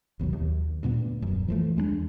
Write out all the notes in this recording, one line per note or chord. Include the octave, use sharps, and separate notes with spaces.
G#1 D#2 B2 F#3
D#2
D2 A#2 A#3 B3
D#1 F#2
E3 F3 A3
E2 G#3 B3 D4